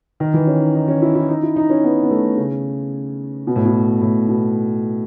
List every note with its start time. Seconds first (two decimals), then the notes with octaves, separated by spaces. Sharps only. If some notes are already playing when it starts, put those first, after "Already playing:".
0.20 D#3
0.34 E3
0.47 C#4
0.60 D#4
0.75 D#4
0.88 C#4
1.02 E4
1.15 E4
1.29 D#4
1.43 E4
1.56 D#4
1.70 C#4
1.84 B3
2.03 B3
2.11 A3
2.37 C#3
3.47 B2
3.56 A2
3.65 B2
4.02 A2
4.29 B2